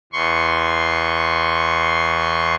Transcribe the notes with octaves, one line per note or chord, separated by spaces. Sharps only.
E2 C6 C#6